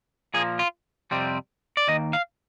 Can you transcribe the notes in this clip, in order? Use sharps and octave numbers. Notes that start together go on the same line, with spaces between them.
A#2 F3 A#3 G#4
F4
F2 C3 G3 C4
D5
D#2 D#3 A#3 D#5
F5